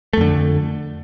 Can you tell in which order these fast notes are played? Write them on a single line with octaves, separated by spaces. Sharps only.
A3 F2 D3